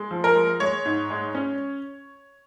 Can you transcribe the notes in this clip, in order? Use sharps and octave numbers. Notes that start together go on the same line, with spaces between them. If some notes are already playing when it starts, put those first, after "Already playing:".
Already playing: G#3
F3
A#4
G#3
G#3 C#5
G#2
G#3
C#4